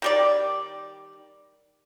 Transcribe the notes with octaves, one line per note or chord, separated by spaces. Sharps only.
D#3 G3 D5